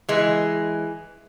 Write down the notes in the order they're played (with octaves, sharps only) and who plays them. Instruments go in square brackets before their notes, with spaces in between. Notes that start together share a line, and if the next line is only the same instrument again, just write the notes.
[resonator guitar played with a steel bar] E3 G#3